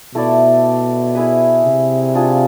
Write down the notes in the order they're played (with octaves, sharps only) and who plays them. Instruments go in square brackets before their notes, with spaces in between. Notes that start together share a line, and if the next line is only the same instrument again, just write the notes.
[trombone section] B2 [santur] A3 E4 A4 D5
[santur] E4 G#4 B4
[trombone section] C3
[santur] D4 F4 G#4